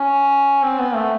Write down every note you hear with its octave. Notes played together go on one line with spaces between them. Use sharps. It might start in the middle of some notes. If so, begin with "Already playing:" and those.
Already playing: C#4
C4
B3
A3